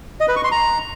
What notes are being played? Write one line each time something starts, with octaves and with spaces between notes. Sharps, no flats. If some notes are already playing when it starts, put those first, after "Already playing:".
D#5
B4
C#6
C6
A#5